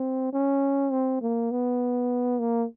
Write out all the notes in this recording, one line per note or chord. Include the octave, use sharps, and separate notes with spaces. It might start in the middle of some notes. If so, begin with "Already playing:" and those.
Already playing: C4
C#4
C4
A#3
B3
A#3